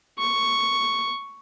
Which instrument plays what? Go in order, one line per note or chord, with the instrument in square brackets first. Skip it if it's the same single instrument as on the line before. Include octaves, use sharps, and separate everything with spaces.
[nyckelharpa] C#6